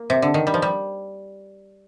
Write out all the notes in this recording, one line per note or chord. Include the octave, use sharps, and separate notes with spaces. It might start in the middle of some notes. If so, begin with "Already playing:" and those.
Already playing: A#3
C3
D3
D#3
G3
F3
G3